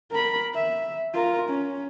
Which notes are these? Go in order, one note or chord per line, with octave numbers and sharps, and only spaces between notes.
A#4 B5
E5
F4 A#4
C#4